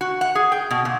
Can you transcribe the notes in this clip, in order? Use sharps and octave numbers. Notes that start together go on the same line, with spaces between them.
F#4
F#5
G#4
G5
B2
A#2